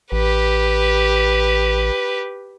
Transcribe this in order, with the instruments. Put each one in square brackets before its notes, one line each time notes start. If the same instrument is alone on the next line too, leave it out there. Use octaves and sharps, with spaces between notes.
[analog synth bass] A1 [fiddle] G4 B4